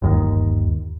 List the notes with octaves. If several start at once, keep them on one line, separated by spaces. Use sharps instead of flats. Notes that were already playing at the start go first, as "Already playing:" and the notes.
G1 D#2 D#3